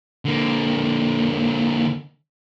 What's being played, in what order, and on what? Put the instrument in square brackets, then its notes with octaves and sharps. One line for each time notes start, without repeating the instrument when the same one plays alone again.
[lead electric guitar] D3 A#3